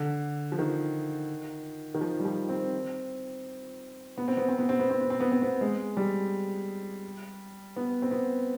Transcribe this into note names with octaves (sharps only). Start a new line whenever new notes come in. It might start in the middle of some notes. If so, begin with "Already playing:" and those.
Already playing: D3
F3
D#3
D#3
F3
G3
F3
C4
B3
C4
B3
C4
B3
C4
B3
C4
B3
C4
B3
C4
B3
G#3
G3
B3
C4
B3